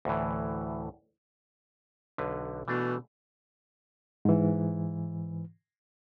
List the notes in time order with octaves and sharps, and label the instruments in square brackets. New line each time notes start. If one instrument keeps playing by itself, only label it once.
[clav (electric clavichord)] D2 A2 E3
B1 D3 B4
[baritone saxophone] B2 [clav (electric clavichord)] E3 A3 D4
[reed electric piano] G#2 E3